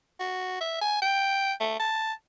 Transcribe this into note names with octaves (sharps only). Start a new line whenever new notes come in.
F#4
E5
G#5
G5
A3
A5